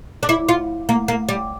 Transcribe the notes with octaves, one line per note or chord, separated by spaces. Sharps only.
D4
E4
F4
A#3
A#3
G3